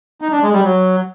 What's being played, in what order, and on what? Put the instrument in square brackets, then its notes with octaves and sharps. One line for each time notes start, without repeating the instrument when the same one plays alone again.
[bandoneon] D#4
D4
G#3
G3
F#3